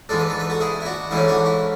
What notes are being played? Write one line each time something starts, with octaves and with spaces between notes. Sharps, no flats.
G#2 E3 G#3 D4 A4
B4
A4
B4
F#4 A4
E4 G#4
E4
D4 F#4
G#2 E3 A3 C#4 E4 G#4
D4 F#4
E4